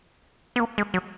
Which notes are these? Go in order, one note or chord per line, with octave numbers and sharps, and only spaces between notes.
B3
A#3
G#3
F#3